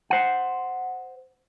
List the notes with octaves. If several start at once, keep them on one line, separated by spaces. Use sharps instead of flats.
C5 F#5